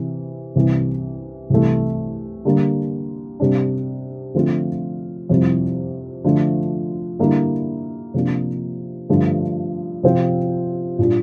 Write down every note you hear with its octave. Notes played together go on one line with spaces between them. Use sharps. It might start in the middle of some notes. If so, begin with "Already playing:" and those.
Already playing: C3 E3
C2 C3 E3
C2 C3 E3 A3
D3 G3 A#3
C3 G3 D4
D3 F3 A3 C4 F4
F2 C3 G3 C4 E4
D3 F3 A3
D3 G3 A#3 E4
C3 F3 A#3 D4
G2 D3 F3 A3
C3 F3 C4
A#2 G3 D4 F4